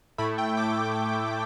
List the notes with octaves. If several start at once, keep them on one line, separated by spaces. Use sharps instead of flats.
A2 A3 E4 B5
G5
D6